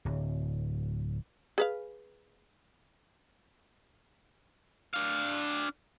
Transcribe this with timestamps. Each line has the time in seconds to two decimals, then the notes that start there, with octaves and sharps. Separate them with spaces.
0.05 D1
1.58 G#4 B4 F5
4.94 D4 F5